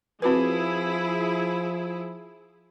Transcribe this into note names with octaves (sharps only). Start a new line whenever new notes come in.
F3 C4 E4 F#4 G#4 B4